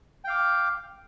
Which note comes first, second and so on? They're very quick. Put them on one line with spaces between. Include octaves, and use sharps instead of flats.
G5 F5 D6